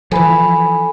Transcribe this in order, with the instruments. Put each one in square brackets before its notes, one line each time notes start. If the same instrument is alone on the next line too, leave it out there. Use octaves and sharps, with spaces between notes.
[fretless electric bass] E3 F3 [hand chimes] A4 G#5 B5